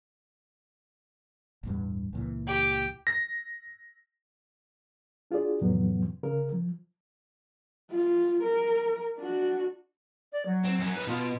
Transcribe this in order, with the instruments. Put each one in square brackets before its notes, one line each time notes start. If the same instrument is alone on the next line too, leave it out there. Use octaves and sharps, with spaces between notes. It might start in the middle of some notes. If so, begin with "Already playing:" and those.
[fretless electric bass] A1 E2 G2
C#2 A#2 E3
[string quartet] G4
[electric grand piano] A#6
[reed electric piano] D4 F4 F#4 G#4 D5
F2 A2 C3 E3 F#3 B3
C#3 A#4
F3
[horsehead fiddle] F4
A#4
D4 F#4
[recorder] D5
F#3
[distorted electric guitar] C4
F#2 C#4
D#4 B4
[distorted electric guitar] B2 [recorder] F4